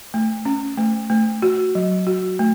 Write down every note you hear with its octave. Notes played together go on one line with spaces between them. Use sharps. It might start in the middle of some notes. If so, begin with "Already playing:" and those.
A3
C#4
A3
A3
F#4
F#3
F#4
A3